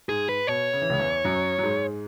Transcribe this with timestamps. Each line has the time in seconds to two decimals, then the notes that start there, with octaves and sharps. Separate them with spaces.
0.09 G#2 G#4
0.29 B4
0.47 B2 C#5
0.73 C#3
0.82 E3
0.90 C#2 C#3
0.99 E2 E3
1.24 F#2 F#3
1.58 F#3
1.63 G#2 G#3